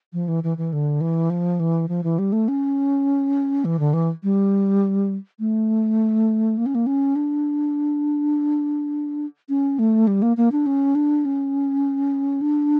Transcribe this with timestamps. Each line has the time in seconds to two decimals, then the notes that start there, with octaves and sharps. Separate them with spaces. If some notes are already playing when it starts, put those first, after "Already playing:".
0.13 F3
0.28 E3
0.44 E3
0.58 E3
0.73 D3
1.01 E3
1.30 F3
1.60 E3
1.88 F3
2.04 E3
2.19 G3
2.32 A3
2.48 C#4
3.65 E3
3.79 D3
3.93 E3
4.23 G3
5.39 A3
6.57 A#3
6.66 C#4
6.75 A#3
6.86 C#4
7.16 D4
9.49 C#4
9.79 A3
10.07 G3
10.22 A#3
10.37 A#3
10.52 D4
10.66 C#4
10.95 D4
11.25 C#4
12.41 D4